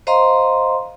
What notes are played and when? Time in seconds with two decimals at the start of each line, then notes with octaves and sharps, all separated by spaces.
0.07 C5 D#5 F5 A#5 C6